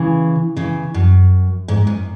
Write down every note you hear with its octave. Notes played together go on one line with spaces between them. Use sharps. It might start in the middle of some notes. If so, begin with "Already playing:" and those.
Already playing: C#3 E3
C#3 E3
F#2
G#2
F#2